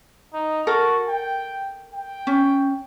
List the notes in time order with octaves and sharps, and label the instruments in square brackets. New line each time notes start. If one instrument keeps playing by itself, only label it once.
[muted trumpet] D#4
[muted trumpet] F#4 [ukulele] A4 A#4
[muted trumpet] G5
G5
[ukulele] C#4